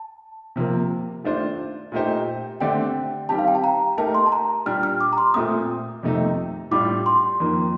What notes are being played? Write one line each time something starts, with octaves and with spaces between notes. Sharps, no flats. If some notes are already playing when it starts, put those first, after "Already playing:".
Already playing: A5
C3 F3 A#3
D#3 A3 D4 F4 C5
A#2 A3 D#4 G4 C5
D3 A3 C4 G4 D5 G5
D#3 G3 C4 G4 A5
F5
G5
A5
A#5
A3 D#4 G4 A#4 A5
C6
A5
A#5
A#2 G3 D4 G4 F6
F6
D6
A#5
C6
A#2 A3 C4 D#6
F2 C3 D#3 A3 D#4
A2 G3 D4 F4 D6
C6
F2 D#3 A#3